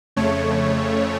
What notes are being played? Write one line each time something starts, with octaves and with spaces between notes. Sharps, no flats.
F2 C#3 A3 C#5